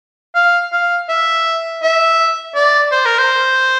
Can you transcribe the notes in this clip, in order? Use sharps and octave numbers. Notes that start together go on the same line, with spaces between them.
F5
F5
E5
E5
D5
C5
A#4
C5